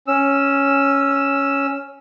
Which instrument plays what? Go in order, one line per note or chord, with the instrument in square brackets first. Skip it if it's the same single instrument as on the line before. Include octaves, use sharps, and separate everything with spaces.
[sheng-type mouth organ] C#4 E6